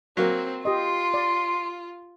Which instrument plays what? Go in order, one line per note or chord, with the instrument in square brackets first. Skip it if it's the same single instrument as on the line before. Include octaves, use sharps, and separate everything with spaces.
[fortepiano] F#3 A#3 [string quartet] C4
[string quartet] F4 [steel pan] G4 D#5 [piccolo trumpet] C6
[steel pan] D5